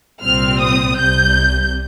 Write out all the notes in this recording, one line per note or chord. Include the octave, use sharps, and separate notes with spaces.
C2 A#2 G3 C4 F6
D#6
C2 C3 G3 G6